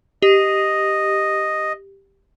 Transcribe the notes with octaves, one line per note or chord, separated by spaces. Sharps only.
G4 D#5